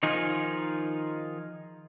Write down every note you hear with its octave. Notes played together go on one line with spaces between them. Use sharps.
D#3 F3 D#4 F4 G#4